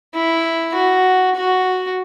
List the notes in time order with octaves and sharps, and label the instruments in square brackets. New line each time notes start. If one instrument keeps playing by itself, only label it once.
[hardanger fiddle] E4
F#4
F#4